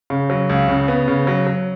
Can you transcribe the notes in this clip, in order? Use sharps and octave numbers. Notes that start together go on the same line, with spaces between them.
C#3
F#3
C#2
C#3
B3
C#3
F#3
F#3